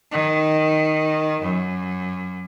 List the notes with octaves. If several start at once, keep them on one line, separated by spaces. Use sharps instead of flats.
D#3
F#2